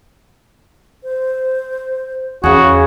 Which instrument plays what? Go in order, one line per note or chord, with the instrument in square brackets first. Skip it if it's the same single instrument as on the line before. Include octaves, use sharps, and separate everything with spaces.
[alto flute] C5
[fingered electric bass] E2 [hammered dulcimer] C#3 G#4 [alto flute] C#4 [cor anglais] F#4